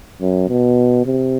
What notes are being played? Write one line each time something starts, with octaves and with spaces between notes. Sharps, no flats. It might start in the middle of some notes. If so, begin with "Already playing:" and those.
F#2
B2
C3